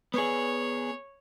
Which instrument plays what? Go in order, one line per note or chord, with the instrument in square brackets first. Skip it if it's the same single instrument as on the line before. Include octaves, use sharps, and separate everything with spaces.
[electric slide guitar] B3 G#4 [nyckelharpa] C#5